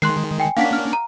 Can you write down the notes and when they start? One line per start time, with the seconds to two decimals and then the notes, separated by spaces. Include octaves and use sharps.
0.02 D#3 G#3 C6 F#6 C7
0.40 G5 G#5
0.57 A#3 C#4 D4 F5 F#5 B6
0.73 F6
0.93 A#5